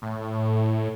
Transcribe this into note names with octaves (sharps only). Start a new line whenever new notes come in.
A2